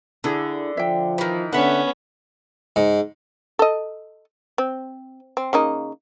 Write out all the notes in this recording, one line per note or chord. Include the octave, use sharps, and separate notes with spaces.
D3 D4 E4 G#4
F3 E5 G5
D#3 E3
D3 B3 C#4 E5 F#5
G#2
A4 D#5
C4
C4
C#3 A#3 D#4